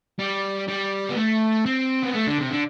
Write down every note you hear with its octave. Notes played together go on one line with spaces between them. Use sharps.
G3
G3
B3
A3
C4
B3
A3
D3
C3
D3